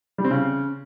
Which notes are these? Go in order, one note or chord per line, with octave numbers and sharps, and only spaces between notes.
G3
C4
C#3